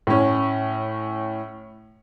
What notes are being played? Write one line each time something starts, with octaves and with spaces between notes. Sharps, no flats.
A2 C#4